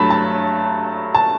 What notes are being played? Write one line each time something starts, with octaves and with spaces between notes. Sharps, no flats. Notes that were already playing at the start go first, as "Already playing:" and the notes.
Already playing: G2 F#3 A3 A5 B5
A5
A5